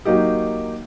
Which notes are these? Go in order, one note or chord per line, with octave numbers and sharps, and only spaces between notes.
F#3 A#3 D#4 G4